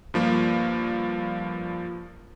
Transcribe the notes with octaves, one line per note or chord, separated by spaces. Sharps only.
G2 F3 A#3